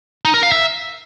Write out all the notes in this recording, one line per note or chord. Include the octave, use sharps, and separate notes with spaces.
D#4
A#4
F5
E5